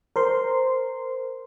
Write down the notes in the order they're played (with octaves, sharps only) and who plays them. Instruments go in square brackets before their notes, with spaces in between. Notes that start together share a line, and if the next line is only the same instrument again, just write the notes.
[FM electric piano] A#4 C5 C6